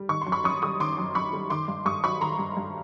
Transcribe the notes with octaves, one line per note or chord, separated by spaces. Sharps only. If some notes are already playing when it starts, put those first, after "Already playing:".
Already playing: G3
D#3 C#6
C6
F#2
B5 C#6
F#2 C#6 D#6
G3 C#6 D#6
D#3 C6 D6
F#2
F#2 B5 C#6
G3
D#3 C6 D6
G2
G2 C#6 D#6
F#3 B5 C#6
D#3 A#5 C6
G2
G2